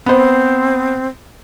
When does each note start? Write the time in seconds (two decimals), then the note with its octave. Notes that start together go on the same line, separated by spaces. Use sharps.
0.06 B3 C4 C5